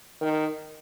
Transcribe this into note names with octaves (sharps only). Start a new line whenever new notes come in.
D#3